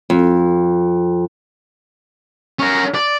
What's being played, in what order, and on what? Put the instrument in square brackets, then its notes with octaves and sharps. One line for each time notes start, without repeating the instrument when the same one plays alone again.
[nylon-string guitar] F2
[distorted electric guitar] C#4 A#4
D5